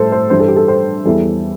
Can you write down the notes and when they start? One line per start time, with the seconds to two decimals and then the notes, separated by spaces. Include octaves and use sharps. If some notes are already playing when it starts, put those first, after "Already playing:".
Already playing: A2 G3 A4 C5
0.12 C5
0.30 G2 E3 G3 C5
0.39 A4
0.48 G4
0.56 A4
0.68 C5
1.05 E2 E3 G3 A4